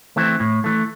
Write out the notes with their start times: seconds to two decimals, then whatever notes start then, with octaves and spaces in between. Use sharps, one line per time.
0.16 E3 A3 C4
0.40 A2
0.64 E3 A3